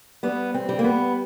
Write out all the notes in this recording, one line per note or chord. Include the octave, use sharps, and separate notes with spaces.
G3 B3
C4
G3
A#3
B3